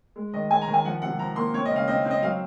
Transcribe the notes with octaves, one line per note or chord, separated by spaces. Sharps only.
G#3
D#3 D#5
G#3 G#5
A#5
D#3
G#5
F3 F#5
C3 F#5
F3 A#5
A#3 C6
C4 C#5
D#5
C#3 F5
C4 D#5
C4
D#5
F#3 F5